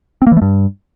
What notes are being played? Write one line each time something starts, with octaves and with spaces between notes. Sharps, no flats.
C4
A#3
E3
A3
G2